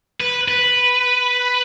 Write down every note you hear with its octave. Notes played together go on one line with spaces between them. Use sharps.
B4
B4